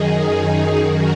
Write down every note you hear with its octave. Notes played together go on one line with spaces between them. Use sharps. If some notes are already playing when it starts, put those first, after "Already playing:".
Already playing: F#2 D#3 D#4 G#4
F#2 D#3 F#4 A#4